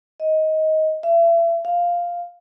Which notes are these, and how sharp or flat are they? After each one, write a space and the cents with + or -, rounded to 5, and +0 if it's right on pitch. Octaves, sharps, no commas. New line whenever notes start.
D#5 +15
E5 +35
F5 +0